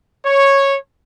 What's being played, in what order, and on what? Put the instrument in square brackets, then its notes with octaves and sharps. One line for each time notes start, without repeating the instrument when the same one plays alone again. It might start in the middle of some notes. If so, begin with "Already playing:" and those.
[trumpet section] C#5